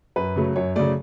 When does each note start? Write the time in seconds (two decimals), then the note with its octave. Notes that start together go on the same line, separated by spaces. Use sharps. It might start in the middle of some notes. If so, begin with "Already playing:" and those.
0.16 F#2 B4
0.36 C#3 F#3 A3
0.56 F#2 C#5
0.76 C#3 F#3 A3 D5